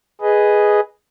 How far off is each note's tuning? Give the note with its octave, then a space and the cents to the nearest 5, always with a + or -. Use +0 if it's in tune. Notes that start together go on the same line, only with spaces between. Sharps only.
G#4 +0 B4 +0 D#5 +0